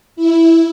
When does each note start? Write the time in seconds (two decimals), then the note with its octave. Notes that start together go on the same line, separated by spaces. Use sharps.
0.16 E4